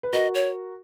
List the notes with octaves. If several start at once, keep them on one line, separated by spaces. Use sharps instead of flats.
B4
F#4 A#4 D#5
C#5